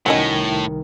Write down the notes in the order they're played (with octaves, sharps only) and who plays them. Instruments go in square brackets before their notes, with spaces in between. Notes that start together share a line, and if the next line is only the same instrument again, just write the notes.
[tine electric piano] C2 D#3 [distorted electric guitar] A2 [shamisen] F#3 C#4 D#5